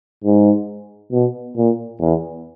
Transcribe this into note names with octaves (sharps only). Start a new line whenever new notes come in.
G#2
B2
A#2
E2